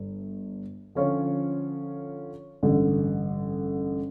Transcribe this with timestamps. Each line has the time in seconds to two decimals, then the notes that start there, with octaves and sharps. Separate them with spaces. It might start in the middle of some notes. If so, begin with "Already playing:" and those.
Already playing: G1 G2
0.95 D3 F3 C#4 F4 C#5
2.63 A1 G2 D3